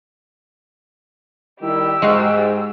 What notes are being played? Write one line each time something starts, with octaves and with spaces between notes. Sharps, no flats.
D#3 G3 E4 G4 E6
G#2 G#3 F#4 F5